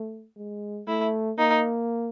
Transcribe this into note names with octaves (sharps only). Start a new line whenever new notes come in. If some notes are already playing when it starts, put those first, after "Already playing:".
Already playing: A3
G#3
A3 E4
A#3 D#4